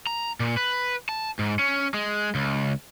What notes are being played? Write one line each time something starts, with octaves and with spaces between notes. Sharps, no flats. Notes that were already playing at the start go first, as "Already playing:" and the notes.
A#5
A#2
B4
A5
G#2
C#4
G#3
C#2